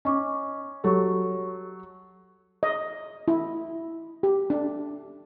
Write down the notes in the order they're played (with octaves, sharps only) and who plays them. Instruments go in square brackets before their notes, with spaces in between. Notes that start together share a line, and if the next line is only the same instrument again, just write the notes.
[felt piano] C#4 [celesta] D#5 C#6 D6
[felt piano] F#3 A4 [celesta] G4 C#5 C#6
[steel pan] D#5
E4
G4
D4